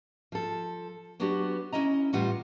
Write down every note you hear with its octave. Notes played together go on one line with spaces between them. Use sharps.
F3 A4
F#3 B3 D4 F#4 G4
C#4 E4 D#5 A#5
A2 E3 G3 F4 F#5